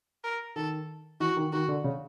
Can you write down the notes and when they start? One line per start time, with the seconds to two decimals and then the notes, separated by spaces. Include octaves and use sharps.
0.24 A#4
0.56 D#3 A4
1.20 E3 F#4
1.37 D#3
1.52 D#3 F#4
1.68 D3
1.84 C#3